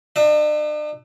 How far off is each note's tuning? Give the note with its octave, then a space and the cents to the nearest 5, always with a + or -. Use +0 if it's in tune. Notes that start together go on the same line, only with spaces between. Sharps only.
D4 +45 E5 -10